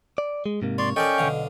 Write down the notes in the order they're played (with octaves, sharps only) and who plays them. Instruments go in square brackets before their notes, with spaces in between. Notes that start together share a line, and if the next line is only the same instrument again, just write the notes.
[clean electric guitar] D5
G#3
G#2 C3 A#3
[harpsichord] C#5 [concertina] D5 C6
[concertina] C#4 G5 C#6 [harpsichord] A4 A#4 D5 [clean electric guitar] D#5
[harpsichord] B1 D3 F5